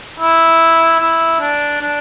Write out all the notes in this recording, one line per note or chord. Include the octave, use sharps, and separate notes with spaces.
E4
E4
D4
D4